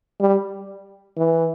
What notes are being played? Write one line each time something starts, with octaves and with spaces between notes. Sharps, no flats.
G3
E3